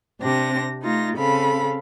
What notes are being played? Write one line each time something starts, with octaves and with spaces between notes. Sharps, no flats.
C3 C4 D4 G4 A#6
A3 D#4 F4 A#6
C#3 C4 A4 F5 B5